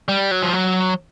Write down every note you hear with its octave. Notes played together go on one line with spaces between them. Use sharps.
G3
F#3
F3
F#3